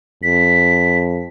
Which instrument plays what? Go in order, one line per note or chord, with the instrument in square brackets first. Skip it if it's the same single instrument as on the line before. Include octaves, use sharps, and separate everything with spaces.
[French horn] F2 [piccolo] B6